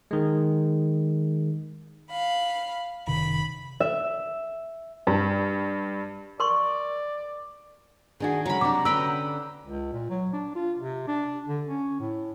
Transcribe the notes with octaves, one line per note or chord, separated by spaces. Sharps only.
D#3 G#3
F5 B5
F#1 C3 D#3 B5
E5
G2
A#4 D5 C6 C#6
D#3 D4 F#4 G#4
C#3 F#3 G#3 A#5 B5
C3 D4 D6
D3 C#4 B4 G5 B5 E6
C#2
A#2
F#3
D4
F4
C3
D4
D3
C#4
A2